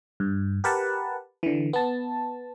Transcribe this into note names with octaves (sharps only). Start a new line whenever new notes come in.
G2
G4 A#4 B4 F#5 A5
D3 E3
B3 A5